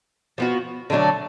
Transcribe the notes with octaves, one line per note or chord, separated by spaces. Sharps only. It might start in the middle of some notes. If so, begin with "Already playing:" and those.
F3 B3 F#4
D3 F#3 A3 D4